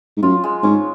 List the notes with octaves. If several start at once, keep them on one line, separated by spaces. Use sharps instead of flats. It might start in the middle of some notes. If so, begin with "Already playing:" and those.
G#2
F#2 F4
G#3
G#2 C#4